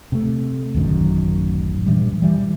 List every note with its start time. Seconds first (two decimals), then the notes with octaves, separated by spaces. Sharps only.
0.12 C3 A3
0.74 D1 A1 F#2 D#3
1.86 G2 A#2 E3 G3
2.22 E3 G3